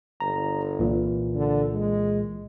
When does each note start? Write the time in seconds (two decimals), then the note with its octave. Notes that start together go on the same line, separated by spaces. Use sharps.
0.20 G1 A#5
0.79 C2 A#2 E3
1.35 D3
1.74 G#3